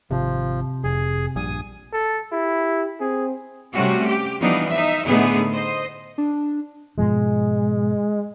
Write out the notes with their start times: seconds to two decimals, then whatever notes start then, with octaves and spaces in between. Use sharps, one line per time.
0.11 G#1 C3 F3
0.84 F1 G#4
1.36 A#1 G2 G#5 D#6
1.93 A4
2.32 E4 G4
3.00 C4 G#4
3.73 C3 G3 A3 C#4 F#4
4.06 G4
4.40 E3 F3 G3 B3 D4 D#4
4.71 D#4 E5
5.07 A2 D3 A3 B3 D#4 G#4
5.50 C5 D#5
6.18 D4
6.98 G#2 B2 F3 G#3